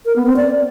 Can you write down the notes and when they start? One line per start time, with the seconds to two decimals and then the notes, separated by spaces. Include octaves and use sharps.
0.06 A#4
0.16 B3
0.26 C4
0.37 D5